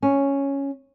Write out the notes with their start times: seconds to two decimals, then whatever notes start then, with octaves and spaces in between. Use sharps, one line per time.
0.02 C#4